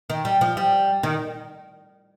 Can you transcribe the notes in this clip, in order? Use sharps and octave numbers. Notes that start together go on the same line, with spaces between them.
D#3
G3
F3
G3
D#3